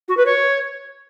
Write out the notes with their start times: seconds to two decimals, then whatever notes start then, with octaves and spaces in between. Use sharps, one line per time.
0.08 F#4
0.17 B4
0.26 C#5